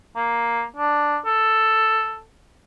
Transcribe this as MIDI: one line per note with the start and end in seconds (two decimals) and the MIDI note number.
0.16 0.64 58
0.76 1.17 62
1.26 2.20 69